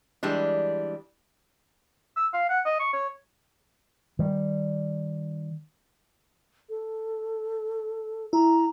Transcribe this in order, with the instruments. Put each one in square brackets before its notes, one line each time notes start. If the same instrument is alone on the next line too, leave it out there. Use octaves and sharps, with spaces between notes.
[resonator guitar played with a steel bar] E3 G3 G#3 D4
[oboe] E6
F5
F#5
D#5
C#6
C#5
[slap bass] D#3 G3
[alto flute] A4
[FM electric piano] E4 [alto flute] A#5